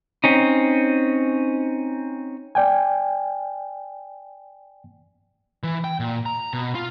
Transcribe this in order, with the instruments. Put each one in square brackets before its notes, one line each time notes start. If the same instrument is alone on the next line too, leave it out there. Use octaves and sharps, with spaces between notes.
[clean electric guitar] C4 C#4 D#4
[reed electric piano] D5 G5 G#5
[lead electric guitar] E3
G5
A#2
A#5
B2
F4